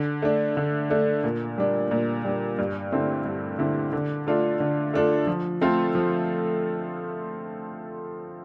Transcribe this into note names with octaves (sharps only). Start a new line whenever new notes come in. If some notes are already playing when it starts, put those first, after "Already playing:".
Already playing: D3
A3 D4
D3
A3 D4
A#2
G3 D4
A#2
G3 D4
G2
D3 A3 C4 E4
G2
D3 A3 C4 E4
D3
A3 D4 F4 A4
D3
A3 D4 F4 A4
F3
A3 C4 F4 A4
F3